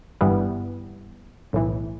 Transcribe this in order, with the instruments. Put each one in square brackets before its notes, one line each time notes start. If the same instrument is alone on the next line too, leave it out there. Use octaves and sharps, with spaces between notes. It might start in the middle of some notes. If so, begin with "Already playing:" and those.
[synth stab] G1 G2 E3 G3 B3
B1 A2 E3